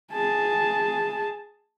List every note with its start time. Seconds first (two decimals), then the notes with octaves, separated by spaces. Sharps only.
0.13 G#4 A5